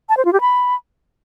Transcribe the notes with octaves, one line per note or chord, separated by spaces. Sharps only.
A5
C5
F4
G4
B5